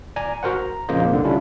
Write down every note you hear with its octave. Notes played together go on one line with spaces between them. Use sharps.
D5 G#5 A#5
F#4 A#4 C5 F#5
A#5
F2 A#2 C#3 A#3 C5 D#5
C2 D3
G3 C#4 D4 E4 F4